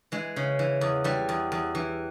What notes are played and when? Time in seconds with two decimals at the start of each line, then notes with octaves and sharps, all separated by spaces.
0.12 E3 G#3
0.36 C#3
0.59 E3
0.81 E2
1.04 E3 G3
1.29 E2
1.52 E2
1.75 E3